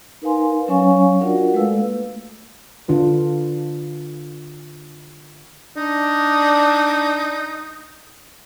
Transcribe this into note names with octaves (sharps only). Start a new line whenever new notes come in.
D#4 A#4 B4 F5 G#5 C6
F#3 C#4 C#5 F5 G#5 C#6
D4 F4 F#4 A#4 D5 F#5
G#3 A3 A4 B4 F5 E6
A#3
D3 D4 F4 B4
D4 D#4